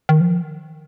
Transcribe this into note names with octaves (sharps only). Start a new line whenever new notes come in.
D#3
F3